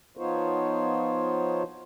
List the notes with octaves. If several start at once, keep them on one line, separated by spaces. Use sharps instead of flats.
F3 B3 D#4 F4 C5 C#5